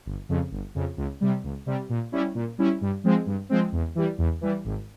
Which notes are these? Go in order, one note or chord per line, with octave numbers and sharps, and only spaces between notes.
G1
F2 C#3
G1
F2 C#3
C#2
C3 G3
C#2
C3 G3
A#2
G3 C#4 E4
A#2
G3 C#4 E4
G2
F3 G#3 C4
G2
F3 G#3 C4
E2
E3 G3
E2
E3 G3
G#1